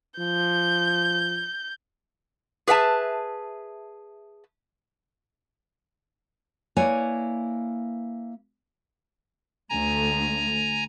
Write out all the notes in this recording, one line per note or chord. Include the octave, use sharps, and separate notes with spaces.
F3 G6
G#4 B4 E5 G5 A5
A#3 E4 B4 C#5 D5 G#5
D2 A3 G#5 A#5